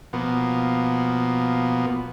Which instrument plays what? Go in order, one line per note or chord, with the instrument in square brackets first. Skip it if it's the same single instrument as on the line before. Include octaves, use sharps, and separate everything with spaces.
[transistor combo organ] B2 F3 A#3 B3